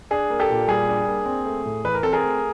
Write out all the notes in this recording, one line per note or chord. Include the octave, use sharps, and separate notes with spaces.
D4 G#4
A#3
G4 A4
A#2
G3 G#4
D4
A#3
C4
A3
A2
E3 B4
A#4
C4 A4
G#4 A#4
A3